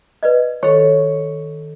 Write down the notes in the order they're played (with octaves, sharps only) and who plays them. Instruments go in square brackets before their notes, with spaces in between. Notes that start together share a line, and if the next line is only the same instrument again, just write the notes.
[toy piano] B4 D5 D#5
[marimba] D#3 A4 [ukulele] C#5 [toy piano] C#6